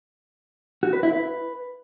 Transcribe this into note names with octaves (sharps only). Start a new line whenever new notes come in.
F#4
B4
E4
B4